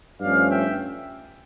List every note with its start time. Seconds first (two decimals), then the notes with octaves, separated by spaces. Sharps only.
0.20 G2 F3 A3 C#4 D5 F5
0.49 E5 G5